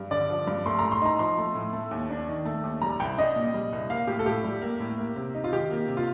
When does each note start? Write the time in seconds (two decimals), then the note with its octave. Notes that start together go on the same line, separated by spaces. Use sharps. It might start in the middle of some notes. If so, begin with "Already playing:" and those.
Already playing: G2
0.11 D3 D5
0.30 F3
0.47 G2
0.66 A3 C6
0.79 A2 A#5
0.92 C6
1.02 D#4 A#5
1.19 F3 C6
1.38 A3
1.55 A2
1.73 A3
1.91 D#2
2.10 D4
2.28 D#3
2.45 A3
2.63 D#2
2.82 G3 A#5
3.00 C2 G5
3.18 D4 D#5
3.36 A#2
3.54 G3
3.73 C2
3.90 A#3 F5
4.07 A2 G4
4.19 A4
4.26 A2 G4
4.44 G3
4.62 A#3
4.80 A2
4.98 A#3
5.16 C3
5.35 D#4
5.44 F4
5.52 D#3 G4
5.71 A#3
5.88 C3
5.97 F4